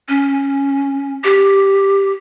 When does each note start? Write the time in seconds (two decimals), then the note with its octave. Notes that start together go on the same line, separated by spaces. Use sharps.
0.09 C#4
1.24 G4